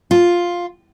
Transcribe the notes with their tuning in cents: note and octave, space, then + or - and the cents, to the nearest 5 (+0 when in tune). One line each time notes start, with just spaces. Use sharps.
F4 +5